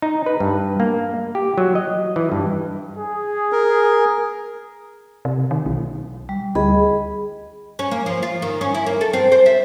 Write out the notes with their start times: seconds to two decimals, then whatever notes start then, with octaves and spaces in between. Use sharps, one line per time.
0.02 D#4
0.26 B4
0.40 G2
0.80 A#3
1.35 G4
1.58 F#3
1.75 D#5
2.16 E3
2.32 G2
2.98 G#4
3.52 A#4
5.25 C3
5.51 D#3
5.66 B1
6.29 G3
6.55 D2 G#4 D#5 B5
7.79 C#4
7.91 A#3
8.06 F3
8.23 F4
8.42 D#3
8.61 C#4
8.75 E4
8.86 A#3
9.01 A4
9.13 C4
9.32 C5
9.46 E5